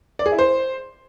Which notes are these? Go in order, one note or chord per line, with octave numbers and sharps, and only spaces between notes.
D5
G#4
E4
C5